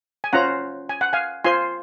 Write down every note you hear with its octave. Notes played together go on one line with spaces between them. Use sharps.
G#5
C#4 F4 C5 F#5 A#5
G#5
F#5
F5 G#5
F4 C5 G#5 C6